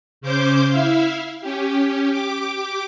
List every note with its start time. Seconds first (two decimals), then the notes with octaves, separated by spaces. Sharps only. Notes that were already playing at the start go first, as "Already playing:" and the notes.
0.21 C#3 C#4 C5 D6 G6
0.68 E4 E5 F5
1.41 C#4 G4
2.09 G4 D6